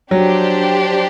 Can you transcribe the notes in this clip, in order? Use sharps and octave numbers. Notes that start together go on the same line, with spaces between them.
F#3 D4 G4 C5